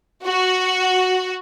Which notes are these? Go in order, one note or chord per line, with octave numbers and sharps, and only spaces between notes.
F#4